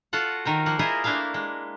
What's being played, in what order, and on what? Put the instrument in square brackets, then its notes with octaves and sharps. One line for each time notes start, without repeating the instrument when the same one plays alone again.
[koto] F4 F#4 A4 F#5
D#3 A#4 C5
F3 A#3 F#5
E4 F4 G#4 A#4 C5 D#5
A3 A#3 D4 E4 A#4 F5
G#3